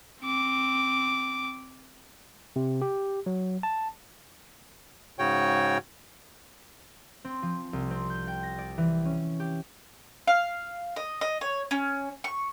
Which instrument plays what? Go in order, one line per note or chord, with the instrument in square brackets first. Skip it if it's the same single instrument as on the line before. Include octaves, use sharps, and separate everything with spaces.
[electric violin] C4 D6
[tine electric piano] C3
G4
F#3
A5
[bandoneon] G#2 C#3 F#4 C#5 G5
[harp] C4
F3
C2
C4
G6
G5
A#6
D5
E3
C#4
G4
[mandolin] F5
D#5
D#5
C#5
C#4
C#6